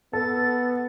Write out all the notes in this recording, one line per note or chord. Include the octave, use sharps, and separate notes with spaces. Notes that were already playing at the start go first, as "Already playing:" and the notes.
B3 A4 A6